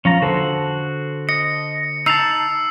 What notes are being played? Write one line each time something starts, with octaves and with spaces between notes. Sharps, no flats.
F3 C#4 F4 A#5
D3 F#4 A4 C5
D#5 C#7
D#4 A5 E6 C7 F7